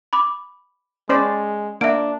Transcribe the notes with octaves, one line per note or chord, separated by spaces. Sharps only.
B5 D6
G#3 C#4 C5 D5
A#3 D4 E5 D7